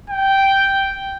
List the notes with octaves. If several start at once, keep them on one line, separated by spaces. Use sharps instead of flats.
G5